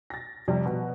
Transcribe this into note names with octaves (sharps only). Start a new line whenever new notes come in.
A6 A#6
F2 C3 G3
B2